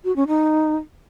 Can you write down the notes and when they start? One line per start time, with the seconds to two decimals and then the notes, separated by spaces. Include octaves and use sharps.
0.04 F#4
0.16 C#4
0.28 D#4